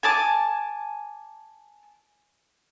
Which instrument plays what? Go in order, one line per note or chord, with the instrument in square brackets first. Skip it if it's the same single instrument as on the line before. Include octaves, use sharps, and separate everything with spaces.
[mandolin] G#5 A5 D6